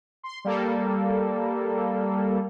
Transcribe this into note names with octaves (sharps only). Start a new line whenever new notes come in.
C6
G3 A#3 A4